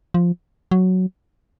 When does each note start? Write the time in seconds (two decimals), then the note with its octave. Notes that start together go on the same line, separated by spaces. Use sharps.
0.14 F3
0.71 F#3